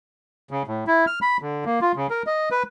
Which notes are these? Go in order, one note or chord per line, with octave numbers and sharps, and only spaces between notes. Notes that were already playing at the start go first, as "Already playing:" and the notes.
C#3
A2
E4
F6
B5
D3
A#3
F4
C#3
A#4
D#5
B4